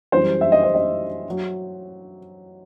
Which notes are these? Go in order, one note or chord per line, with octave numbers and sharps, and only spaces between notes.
F#2 E3 G3 C5
E5
D#5
C5
D#5
F#3